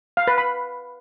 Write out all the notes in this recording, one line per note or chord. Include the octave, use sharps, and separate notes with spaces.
F5
B4
B5